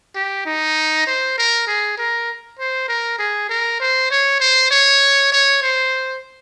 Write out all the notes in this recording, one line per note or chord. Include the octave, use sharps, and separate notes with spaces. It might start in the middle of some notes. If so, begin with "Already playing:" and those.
G4
D#4
C5
A#4
G#4
A#4
C5
A#4
G#4
A#4
C5
C#5
C5
C#5
C#5
C5